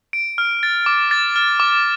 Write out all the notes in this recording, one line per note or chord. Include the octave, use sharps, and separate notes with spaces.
D7
F6
A6
D6
A6
F6
D6